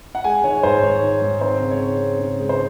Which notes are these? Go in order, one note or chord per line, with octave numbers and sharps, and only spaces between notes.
F#5
G#3 G#5
D#3 C#5
G#2 C5
G#2 C#5
D#3
G#2
C4 C5
C#3
C#5
C4
C4
C#3
G#3
C5